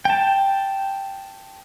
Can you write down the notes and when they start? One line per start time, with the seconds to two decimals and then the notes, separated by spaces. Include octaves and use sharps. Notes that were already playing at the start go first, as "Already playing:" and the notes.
0.05 G5 A5